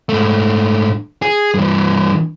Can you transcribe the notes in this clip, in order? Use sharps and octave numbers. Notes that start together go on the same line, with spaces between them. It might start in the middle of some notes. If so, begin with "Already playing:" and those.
G#2 A3
G#4
G2 E3